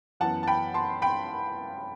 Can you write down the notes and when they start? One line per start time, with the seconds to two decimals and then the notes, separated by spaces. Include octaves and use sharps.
0.20 F#2 E3 B3 F#5 A5
0.43 A5
0.48 G5 B5
0.74 A5 C6
1.02 G5 B5